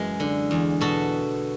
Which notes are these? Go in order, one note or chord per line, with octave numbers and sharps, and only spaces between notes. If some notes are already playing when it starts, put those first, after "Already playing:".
Already playing: F#2 E3 G#3 G#4
D3
E2
B2 F#4 A4